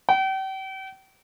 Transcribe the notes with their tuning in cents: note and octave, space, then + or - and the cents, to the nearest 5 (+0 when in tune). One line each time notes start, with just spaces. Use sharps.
G5 -40